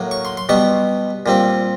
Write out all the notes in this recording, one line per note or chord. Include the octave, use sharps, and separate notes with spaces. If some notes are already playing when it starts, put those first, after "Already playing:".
Already playing: A2 F#3 A#3
C#6
C6
C6
B2 G3 B3 C#6
A#2 G3 C4